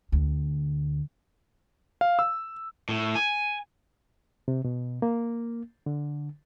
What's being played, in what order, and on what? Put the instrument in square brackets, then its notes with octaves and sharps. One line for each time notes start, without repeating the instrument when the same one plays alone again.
[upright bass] D2
[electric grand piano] F5
E6
[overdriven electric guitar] A2
G#5
[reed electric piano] C3
B2
A#3
D3